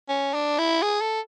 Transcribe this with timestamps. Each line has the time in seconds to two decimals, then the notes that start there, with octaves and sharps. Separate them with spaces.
0.09 C#4
0.33 D4
0.58 E4
0.82 G#4
1.01 A4